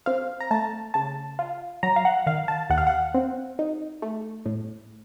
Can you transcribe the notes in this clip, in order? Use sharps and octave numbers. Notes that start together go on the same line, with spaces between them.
C4 F5
A#5
A3 A5
C#3 A5
F4
F#3 A#5
F5
F#5
D#3 F5
A5
D#2 F#5
F5
F#5
C4
D#4
A3
A2